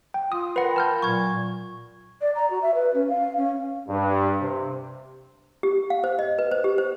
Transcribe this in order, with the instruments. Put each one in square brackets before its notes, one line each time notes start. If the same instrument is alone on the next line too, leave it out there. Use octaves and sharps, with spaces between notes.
[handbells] G5
[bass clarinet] F4 [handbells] D#6
[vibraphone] A#4 G5 B5 [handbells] B4 F#5
[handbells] A5 F6 G6
[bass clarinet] A#2 [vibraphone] F#3 [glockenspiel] C#6 G#6
[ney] D5
A#5
F#4
E5
B4
C#4
F5
C#4
[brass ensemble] G2
C3
[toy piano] G4
F5
C5
D#5
B4
C5
G4
C5